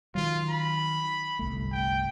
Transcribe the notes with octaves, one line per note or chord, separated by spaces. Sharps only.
D#3 F#3 F4
B5
G1 C2 A3
G5